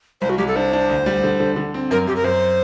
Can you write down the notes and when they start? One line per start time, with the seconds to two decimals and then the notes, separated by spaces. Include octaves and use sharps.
0.21 C2 C5
0.30 F#4
0.38 C2 G4
0.48 A4
0.56 D4 C5
0.73 D4
0.90 D2
1.06 G3
1.24 D3
1.40 D3
1.56 D3
1.74 C4
1.91 F#2 A#4
2.07 F#2 G4
2.16 A#4
2.24 F#2 C5